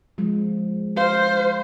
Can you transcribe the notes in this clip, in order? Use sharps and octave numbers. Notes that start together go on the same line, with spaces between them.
F3 G#3
C5 F5